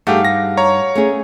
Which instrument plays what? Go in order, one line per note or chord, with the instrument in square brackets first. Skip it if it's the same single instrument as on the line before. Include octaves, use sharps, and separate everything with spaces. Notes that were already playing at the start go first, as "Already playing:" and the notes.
[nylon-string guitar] G2 D#4 G#4 [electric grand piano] A3 G4 [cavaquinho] F5 F#5
[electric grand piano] A#6
C#5 A#5 C#6
[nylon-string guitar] A3 C#4 G#4